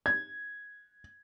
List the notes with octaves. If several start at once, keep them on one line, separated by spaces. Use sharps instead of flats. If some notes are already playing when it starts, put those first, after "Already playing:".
G#6